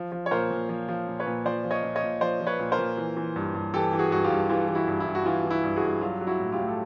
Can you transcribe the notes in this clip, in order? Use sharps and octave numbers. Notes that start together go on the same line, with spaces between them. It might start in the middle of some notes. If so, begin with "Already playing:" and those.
Already playing: F3
F3
C#5
A#2 A#4 C5
A#2
F3
F3
A#2
B4 C#5
A#2
F3 C5 D5
F3
C#5 D#5
A#2
C#5 D#5
A#2
F3 C5 D5
F3
B4 C#5
A#2
A#4 C5
A#2
E3
E3
G2
G2
E3 G4 A4
E3
F#4 G#4
G2 F#4
F4 G4
G2
E3 F4 G4
E3
E4 F#4
G2
E4
G2
F#4
E3 F4
E3
E4 F#4
G2
F#4 G#4
G2
F#3 F4
F#3
E4 F#4
A2
F4 G4
A2
A4